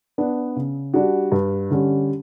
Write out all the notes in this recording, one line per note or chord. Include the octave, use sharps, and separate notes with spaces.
B3 D4
C#3
G3 D4 F#4
G2
D3 G3 C#4